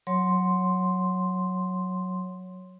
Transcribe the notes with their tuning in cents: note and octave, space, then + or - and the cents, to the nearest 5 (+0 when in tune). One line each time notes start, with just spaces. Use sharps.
F#3 -10 C#5 +0 C6 +0